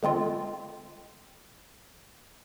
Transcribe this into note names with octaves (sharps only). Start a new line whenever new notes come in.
D3 G#3 C4 F4